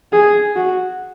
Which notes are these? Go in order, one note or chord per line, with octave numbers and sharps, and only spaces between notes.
G#4
F#4